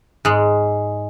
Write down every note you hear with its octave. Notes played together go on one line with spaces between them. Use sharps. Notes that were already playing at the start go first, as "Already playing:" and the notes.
G#2 G#3